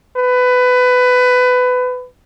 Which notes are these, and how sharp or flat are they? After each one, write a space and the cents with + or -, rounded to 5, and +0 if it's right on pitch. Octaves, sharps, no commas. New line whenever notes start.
B4 +20